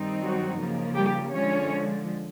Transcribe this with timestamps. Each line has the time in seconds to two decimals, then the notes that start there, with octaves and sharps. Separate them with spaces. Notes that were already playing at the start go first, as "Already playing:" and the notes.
Already playing: G2 D#3 G3 C4 D#4
0.22 F#3 F#4
0.60 C#3 F3 A#3
0.97 G3 G4
1.35 D3 F3 G#3 C#4 C#5